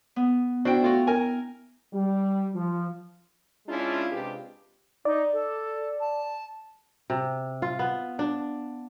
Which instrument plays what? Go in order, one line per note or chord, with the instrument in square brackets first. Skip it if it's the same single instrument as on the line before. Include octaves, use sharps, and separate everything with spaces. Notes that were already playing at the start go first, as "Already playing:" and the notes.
[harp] B3
[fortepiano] D4 F#4 C5 [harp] E4 G5
[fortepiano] A3 F4 F#4
A#4 G#5
[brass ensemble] G3
F3
[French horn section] G#3 C#4 D4 E4 F4
C3 G#3 D4 F4 G4 B4
[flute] D#4 [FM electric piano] D5
[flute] A4
A5
[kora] C3
F4
B3
D4